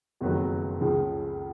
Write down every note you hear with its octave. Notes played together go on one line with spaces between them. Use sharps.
F#1 F2 D#3 F#3 B3
C#2 C#3 F3 G#3